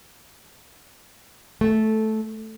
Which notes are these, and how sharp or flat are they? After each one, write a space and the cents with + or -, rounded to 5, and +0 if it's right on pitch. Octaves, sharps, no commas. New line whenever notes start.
A3 -10